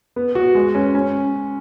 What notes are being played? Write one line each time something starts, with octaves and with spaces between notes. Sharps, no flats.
B3
F#4
G#3
C#4
C#4